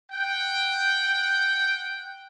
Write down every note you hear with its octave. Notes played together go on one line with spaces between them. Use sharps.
F#5 G5